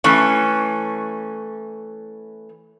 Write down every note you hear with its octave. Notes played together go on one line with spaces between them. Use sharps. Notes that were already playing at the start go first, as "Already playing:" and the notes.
E3 A3 C#4